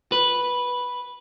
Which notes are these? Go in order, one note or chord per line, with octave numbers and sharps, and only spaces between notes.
B4